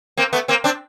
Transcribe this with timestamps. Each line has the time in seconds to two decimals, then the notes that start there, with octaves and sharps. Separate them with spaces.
0.17 A#3 C4
0.33 A3 B3
0.48 A#3 C4
0.64 C4 D4